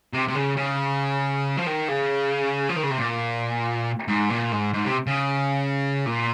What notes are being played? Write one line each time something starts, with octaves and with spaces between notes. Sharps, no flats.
C3
C3
C#3
C#3
F3
D#3
C#3
F3
D#3
C#3
C3
A#2
G#2
A#2
G#2
G#2
C3
C#3
A#2